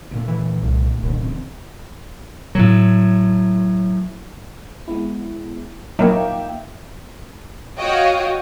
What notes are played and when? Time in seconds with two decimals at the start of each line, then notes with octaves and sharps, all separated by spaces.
0.11 D2 A#2 A3
0.28 E3
0.63 C2
1.03 D#1 C2 D3
1.21 D3 E3 C4
2.55 A2 F#3
4.88 G#3 B3 E4
5.99 F#3 A#3 D#4 E5 G5 D6
7.78 F#4 C#5 D#5 F5 G5